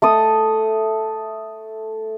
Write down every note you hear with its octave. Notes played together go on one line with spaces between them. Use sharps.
A3 A4 D#6